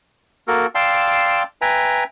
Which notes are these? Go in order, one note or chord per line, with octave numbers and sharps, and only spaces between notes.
A#3 F#4 A4 A#4
D5 F5 G5 A5 C6 E6
B4 E5 G5 G#5 A#5